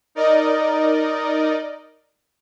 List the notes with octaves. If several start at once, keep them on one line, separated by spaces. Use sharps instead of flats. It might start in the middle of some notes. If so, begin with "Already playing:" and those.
D#4 A#4 D5 D#5